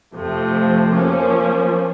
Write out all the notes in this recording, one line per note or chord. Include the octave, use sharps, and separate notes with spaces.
F2 C3 F3 A3
F3 A#3 C#4